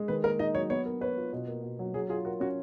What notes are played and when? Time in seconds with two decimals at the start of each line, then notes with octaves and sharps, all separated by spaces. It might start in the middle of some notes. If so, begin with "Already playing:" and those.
Already playing: G#3
0.08 D#3 B4
0.24 A#3 A#4
0.39 D#4 D#5
0.55 F#3 C#5
0.70 B3 C#5
0.86 A#4
1.01 B4 C#5
1.17 F4
1.33 B2
1.48 A#3
1.63 B2
1.79 F#3
1.94 F#3 G#4
2.09 F4 G#4
2.25 F#4 A#4
2.40 C#4 F#4